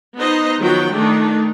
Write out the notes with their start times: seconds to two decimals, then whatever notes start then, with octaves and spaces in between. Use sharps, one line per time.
0.17 B3 D#4 C5 D#5
0.60 D#3 F3 F#3 B3 F#4 G5
0.93 D#3 A3 D4 D#4